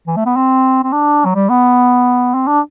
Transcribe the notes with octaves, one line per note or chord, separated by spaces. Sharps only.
E3
A3
B3
C4
C4
D4
F#3
G3
B3
C4
D4